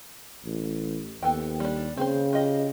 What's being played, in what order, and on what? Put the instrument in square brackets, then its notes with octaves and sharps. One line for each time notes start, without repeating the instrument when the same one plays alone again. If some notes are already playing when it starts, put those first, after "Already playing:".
[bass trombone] A1
[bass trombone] D#2 [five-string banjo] B3 A4 G5
[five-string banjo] G3 D4
[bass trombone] C#3 [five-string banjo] C4 G#4 C5
[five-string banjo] F4 G4 D#5